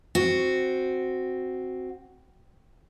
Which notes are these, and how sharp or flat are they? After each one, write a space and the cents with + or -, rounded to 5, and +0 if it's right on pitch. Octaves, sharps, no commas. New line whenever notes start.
C4 +0 F#4 +0